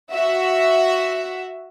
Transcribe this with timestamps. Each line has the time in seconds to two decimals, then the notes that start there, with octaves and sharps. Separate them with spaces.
0.12 F#4 E5